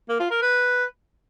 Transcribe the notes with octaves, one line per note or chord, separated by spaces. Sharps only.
A#3
F4
A#4
B4